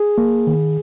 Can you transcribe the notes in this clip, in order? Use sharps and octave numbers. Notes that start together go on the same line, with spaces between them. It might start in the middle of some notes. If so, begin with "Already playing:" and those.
Already playing: G#4
A#3
D#3